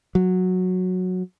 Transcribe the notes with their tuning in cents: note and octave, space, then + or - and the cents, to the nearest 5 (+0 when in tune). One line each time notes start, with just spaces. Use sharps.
F#3 -10